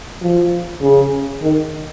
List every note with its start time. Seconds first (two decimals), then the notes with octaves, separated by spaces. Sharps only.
0.22 F3
0.81 C#3
1.42 D#3